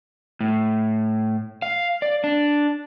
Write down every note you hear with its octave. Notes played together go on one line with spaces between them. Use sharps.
A2
F5
D5
D4